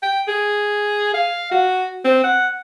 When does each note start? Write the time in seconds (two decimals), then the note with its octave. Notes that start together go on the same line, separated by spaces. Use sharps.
0.03 G5
0.28 G#4
1.14 F5
1.51 F#4
2.05 C4
2.24 F#5